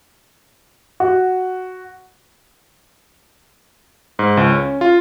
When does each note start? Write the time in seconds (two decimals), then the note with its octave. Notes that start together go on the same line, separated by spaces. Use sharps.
1.00 F#4
4.19 G#2
4.37 C#2
4.51 C#4
4.81 F4